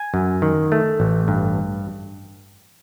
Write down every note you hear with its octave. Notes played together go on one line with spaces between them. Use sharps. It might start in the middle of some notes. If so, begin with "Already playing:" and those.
Already playing: G#5
F#2
D#3
A3
A1
G2